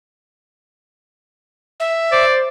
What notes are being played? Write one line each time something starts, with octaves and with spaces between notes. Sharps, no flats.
E5
C5 D5